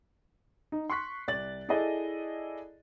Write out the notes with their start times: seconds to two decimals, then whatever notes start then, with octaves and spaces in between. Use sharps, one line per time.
0.72 D#4
0.90 C6 C#6 F#6 B6
1.27 C2 D5 A6 F#7
1.69 E4 G#4 A4 D5 D#5